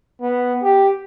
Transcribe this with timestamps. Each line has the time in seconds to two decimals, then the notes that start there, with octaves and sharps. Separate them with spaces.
0.22 B3
0.63 G4